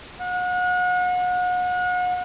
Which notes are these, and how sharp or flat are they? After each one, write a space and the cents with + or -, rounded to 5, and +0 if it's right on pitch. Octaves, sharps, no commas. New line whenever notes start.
F#5 -40